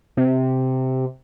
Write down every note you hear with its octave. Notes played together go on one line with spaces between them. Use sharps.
C3